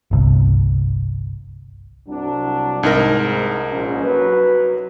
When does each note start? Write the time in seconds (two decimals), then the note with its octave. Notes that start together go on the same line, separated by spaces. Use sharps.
0.11 G1 C2
2.08 C2 F#3 D4
2.83 C2 G#2 D#4 A#4
3.70 A#1 G#2 C#4
4.03 F#3 B4